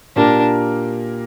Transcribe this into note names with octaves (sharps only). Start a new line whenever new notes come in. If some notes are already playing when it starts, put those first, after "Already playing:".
A#2 A#3 D4 G4 A#4